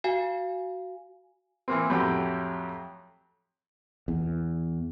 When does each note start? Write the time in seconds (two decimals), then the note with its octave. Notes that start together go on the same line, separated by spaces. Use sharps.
0.04 F#4 F5 G#5
1.68 E3 A#3 C4
1.90 F2 A2 F#3 G4 G5
4.08 E2